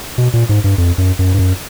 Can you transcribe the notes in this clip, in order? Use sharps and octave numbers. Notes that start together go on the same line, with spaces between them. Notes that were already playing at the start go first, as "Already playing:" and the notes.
B2
A#2
G#2
G2
F2
F#2
F#2
G2
F#2